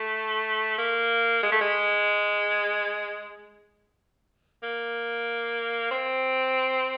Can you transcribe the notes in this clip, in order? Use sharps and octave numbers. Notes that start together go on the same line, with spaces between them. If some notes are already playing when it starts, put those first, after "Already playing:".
Already playing: A3
A#3
G#3
A3
G#3
A#3
C4